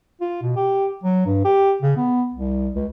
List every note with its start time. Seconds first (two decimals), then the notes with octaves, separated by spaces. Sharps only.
0.21 F4
0.42 B2
0.56 G4
1.03 F#3
1.26 G2
1.44 G4
1.82 C#3
1.97 B3
2.34 C2
2.75 C#2